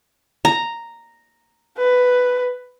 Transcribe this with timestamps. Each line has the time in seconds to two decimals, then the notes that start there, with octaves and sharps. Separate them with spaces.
0.45 A#5
1.78 B4